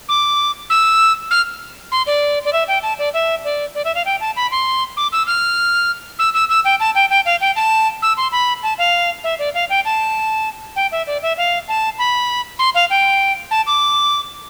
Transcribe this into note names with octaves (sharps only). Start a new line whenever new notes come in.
D6
E6
F6
C6
D5
D5
E5
G5
A5
D5
E5
D5
D5
E5
F5
G5
A5
B5
C6
D6
E6
F6
E6
E6
E6
G5
A5
G5
G5
F5
G5
A5
E6
C6
B5
A5
F5
E5
D5
F5
G5
A5
G5
E5
D5
E5
F5
A5
B5
C6
F5
G5
A5
D6